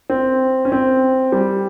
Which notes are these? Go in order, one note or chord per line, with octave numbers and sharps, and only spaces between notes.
C4
C#4
C4
G3